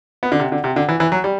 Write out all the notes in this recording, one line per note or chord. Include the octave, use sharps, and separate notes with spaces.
B3
D3
C3
D3
C3
D3
E3
E3
F#3
G3